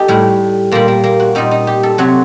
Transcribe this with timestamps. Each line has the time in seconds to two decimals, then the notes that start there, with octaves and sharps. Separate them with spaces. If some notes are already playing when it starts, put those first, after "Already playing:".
Already playing: D#4 G4 A4
0.08 A2 G3
0.72 A#2 G3 A#3
0.88 A#3
1.04 A#3
1.20 F#4
1.35 A#2 G3 D#4
1.51 D#4
1.67 G4
1.83 A4
1.98 C3 F#3 F#4